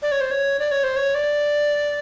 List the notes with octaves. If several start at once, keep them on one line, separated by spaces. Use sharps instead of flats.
D5
C#5
C5
C#5
D5
C#5
C5
C#5
D5